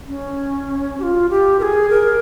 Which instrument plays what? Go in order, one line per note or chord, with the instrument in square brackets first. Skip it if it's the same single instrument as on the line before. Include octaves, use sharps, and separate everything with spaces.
[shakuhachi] C#4
G4
F4
G4
A#4
G#4
A#4